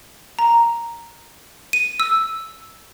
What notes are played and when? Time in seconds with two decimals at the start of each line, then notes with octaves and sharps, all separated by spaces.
0.39 A#5
1.73 D#7
2.00 E6